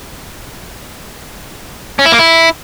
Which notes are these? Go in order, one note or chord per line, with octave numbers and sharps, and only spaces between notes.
C#4
E4
A#3
E4